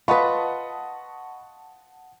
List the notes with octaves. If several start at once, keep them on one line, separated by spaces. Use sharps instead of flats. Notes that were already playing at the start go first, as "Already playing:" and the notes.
F4 B4 D#5 F#5 A5 B5 C#6 D#6